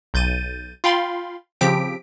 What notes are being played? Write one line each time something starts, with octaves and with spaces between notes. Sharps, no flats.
B1 G6 A6 D#7
F4 F5 G5 B5 C6
C#3 F3 C4 G4 B6 D7